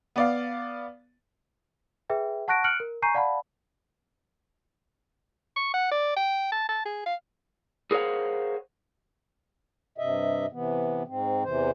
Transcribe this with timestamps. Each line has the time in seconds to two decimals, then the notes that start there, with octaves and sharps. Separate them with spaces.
0.16 B3 D5 F5
2.10 G#4 B4 E5 G5
2.48 F#5 A5 C#6 F#6 A#6 D7
2.64 F6 F#6 C#7 D7 F#7
2.80 A#4
3.02 G#5 A#5 C#6 G6 C7 D#7
3.14 D5 F5 F#5 A5 B5
5.56 C#6
5.74 F#5
5.92 D5
6.17 G5
6.52 A5
6.69 A5
6.85 G#4
7.06 F5
7.91 G#4 A#4 C5 C#5 F5 F#5
9.98 G2 C3 D#5 E5
10.52 C3 E3 B3
11.08 G#2 C4
11.43 E2 C3 E3 C5